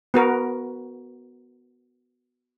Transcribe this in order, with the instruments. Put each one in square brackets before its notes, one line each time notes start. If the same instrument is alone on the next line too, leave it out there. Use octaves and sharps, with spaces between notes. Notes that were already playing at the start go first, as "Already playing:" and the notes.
[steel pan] B3 F#4 A#4